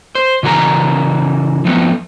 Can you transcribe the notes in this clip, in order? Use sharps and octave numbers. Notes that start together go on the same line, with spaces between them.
C5
C#3 E3 F#4 A#4 A#5
F3 A3 B3 C4